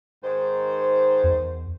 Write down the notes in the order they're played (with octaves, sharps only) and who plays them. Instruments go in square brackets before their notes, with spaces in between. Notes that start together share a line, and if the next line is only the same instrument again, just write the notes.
[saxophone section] G#2 D#3 C5
[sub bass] E2